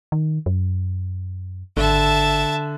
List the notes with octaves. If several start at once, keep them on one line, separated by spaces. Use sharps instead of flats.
D#3
F#2
G#1 D3 E5 A5